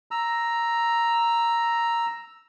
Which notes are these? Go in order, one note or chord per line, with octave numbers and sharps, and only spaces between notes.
A#5 E6